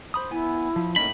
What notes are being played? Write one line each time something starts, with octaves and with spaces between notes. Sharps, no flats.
C5 B5 D#6
B3 E4 G#5
F3
A2 A#3 C#4 D#4 B5